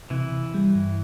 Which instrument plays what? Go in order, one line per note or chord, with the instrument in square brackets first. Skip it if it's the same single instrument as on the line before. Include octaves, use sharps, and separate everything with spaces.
[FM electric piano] C3 [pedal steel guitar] E3 E4
[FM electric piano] C3
G3
G2